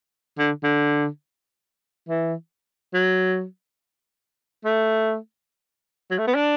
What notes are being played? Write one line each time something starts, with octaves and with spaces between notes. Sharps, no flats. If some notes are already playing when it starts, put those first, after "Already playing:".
D3
D3
E3
F#3
A3
F#3
A3
B3
D4